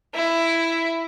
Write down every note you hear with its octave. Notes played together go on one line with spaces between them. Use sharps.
E4